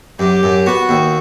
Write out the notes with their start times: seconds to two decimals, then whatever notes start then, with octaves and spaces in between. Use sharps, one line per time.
0.19 F#2 G4
0.43 F#2
0.66 B3 F#4
0.89 D#2